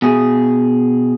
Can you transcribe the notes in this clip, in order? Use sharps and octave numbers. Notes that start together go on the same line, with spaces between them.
B2 G#4